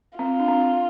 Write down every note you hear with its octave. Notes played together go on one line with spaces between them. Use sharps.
C4 F4
D4
C4